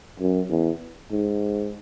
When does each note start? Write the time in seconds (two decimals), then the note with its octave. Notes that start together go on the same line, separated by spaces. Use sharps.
0.19 F#2
0.50 E2
1.11 G#2